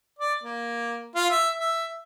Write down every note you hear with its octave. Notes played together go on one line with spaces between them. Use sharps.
D5
A#3
F4
E5
E5